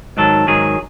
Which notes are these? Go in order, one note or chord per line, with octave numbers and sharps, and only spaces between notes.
G#2 D#3 F#3 A4
G#2 D#3 F#3 G#4